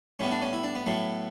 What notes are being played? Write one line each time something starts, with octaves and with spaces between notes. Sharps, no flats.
A2 G3 B3 C#4
D4
C#4
E4
D4
B3
A2 F#3 A3